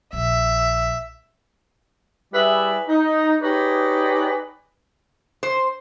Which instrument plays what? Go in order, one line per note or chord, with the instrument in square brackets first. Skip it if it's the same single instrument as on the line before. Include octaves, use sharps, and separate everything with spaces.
[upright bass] A#1 [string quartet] E5
[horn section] G3 E4 G#4 B4 D5 E5
D#4
D#4 G4 G#4 B4 C#5 D5
[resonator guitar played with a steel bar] C5